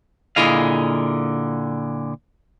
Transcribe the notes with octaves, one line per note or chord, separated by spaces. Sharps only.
A#2 D3 E4 G#4 D#5 F5